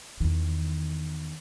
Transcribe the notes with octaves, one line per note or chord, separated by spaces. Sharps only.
E2 D#3